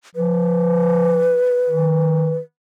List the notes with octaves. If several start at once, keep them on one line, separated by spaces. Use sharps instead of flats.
F3 B4
D#3